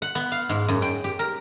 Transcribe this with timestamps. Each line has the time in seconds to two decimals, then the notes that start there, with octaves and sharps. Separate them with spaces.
0.02 F#5
0.15 B3
0.32 F5
0.49 G#2
0.68 F#2
0.82 G5
1.04 G4
1.19 A#4